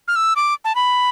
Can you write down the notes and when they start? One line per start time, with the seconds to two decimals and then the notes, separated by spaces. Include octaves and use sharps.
0.08 F6
0.16 E6
0.36 D6
0.65 A5
0.75 B5